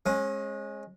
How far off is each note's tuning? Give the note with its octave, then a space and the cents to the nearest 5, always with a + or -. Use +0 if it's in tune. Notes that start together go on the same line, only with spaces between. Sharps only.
G#3 +0 C#4 -35